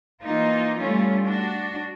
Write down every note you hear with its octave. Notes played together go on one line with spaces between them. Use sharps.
E3 A#3 D#4 F4
G3 A3 C#4 F4
D4 F#4